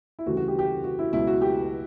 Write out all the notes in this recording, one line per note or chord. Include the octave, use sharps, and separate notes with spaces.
E4
D2 C#3 E3 G3 F#4
F#4
G4
G4
F#4
E4
C#2 B2 F#3 E4
F#4
G4